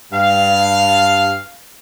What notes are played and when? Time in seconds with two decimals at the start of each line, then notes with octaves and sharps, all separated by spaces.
0.12 G2 F5